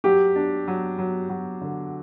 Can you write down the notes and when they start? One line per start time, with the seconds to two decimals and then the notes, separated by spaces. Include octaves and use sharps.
0.04 F#3 G4
0.36 D4
0.68 F#3
0.98 F#3
1.29 F#3
1.61 D3